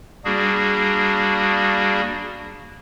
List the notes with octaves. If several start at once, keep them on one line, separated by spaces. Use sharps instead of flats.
G3 A#3 D4 F#4 G#4